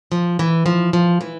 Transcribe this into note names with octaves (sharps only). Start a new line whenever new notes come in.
F3
E3
F3
F3
E3